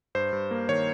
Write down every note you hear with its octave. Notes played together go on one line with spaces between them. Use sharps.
G2 C5
G2
A#3
D#3 C#5